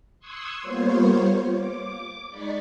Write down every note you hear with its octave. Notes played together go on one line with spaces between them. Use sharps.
C6 C#6 D#6 E6 F#6 G#6
G3 A#3 B3 F4 C5 C#5
D6
G#3 D#4 D5 B5 C#6